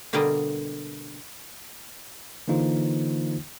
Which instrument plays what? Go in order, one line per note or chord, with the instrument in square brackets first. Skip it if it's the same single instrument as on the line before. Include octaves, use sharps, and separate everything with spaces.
[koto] B2 D3 G3 A#3 D5 D#5
[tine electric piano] D3 E3 A#3 D#4 F4 C5